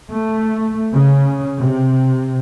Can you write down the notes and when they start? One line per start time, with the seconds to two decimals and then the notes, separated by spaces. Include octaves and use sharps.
0.11 A3
0.93 C#3
1.62 C3